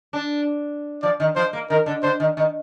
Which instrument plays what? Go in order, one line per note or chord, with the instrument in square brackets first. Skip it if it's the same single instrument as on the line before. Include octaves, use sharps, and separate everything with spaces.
[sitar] D4
[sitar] F3 [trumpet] D5
[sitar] D#3
[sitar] F3 [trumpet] C5
[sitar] A#3
[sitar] D#3 [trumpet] A#4
[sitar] D3
[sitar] D3 [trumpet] C5
[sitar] D#3
D#3